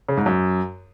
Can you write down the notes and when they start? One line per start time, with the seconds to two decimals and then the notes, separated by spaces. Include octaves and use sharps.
0.08 C#3
0.17 G#2
0.26 F#2